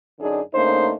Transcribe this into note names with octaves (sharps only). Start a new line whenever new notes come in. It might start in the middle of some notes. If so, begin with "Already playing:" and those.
F#2 D3 D4 D#4 G#4
C#3 A3 A#3 D4 D#4 C5